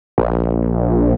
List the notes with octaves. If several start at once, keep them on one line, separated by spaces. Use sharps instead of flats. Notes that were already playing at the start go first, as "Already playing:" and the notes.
A#1